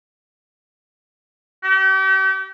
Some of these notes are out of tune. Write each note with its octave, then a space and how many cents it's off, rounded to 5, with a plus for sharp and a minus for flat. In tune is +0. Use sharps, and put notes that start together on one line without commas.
G4 -40